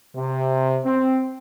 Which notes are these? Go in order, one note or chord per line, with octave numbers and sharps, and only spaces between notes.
C3
C4